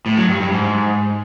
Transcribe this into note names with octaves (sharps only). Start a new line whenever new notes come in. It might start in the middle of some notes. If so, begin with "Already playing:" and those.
A2
F#3
G2
G2
G#2